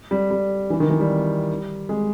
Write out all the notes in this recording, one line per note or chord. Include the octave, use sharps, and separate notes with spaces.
G3
G3
E3
D#3
E3
G3
G#3